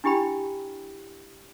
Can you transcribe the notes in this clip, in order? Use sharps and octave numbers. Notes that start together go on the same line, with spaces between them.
D4 E4 G4 G5 B5